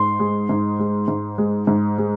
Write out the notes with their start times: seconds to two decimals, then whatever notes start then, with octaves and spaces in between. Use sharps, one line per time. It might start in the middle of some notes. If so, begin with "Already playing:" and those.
Already playing: G#2 C6
0.20 G#3
0.49 G#2
0.79 G#3
1.08 G#2
1.38 G#3
1.67 G#2
1.98 G#3